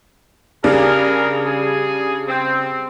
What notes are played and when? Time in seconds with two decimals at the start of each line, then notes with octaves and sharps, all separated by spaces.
0.64 C#3 G3 D4 G#4 A#4
1.46 G#4
2.28 C4